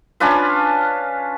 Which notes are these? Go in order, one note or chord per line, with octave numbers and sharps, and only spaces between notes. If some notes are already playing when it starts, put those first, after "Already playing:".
C#4 D4 F4 B4